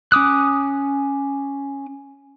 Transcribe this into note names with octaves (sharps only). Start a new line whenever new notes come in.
C#4 D6 D#6 F#6